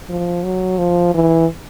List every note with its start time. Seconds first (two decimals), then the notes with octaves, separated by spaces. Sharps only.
0.09 F3
0.44 F#3
0.78 F3
1.14 E3